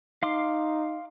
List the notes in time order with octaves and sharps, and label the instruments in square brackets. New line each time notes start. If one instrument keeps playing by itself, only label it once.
[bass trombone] D#4 [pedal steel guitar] F5 C6 D6